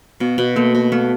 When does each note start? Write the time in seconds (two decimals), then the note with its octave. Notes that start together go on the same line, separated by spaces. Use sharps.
0.20 B2 B3
0.38 B2
0.56 A3 A#3
0.75 B2
0.92 A3 B3